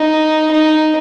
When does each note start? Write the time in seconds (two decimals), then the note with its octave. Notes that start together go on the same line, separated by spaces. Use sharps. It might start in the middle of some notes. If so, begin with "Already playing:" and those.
Already playing: D#4
0.51 D#4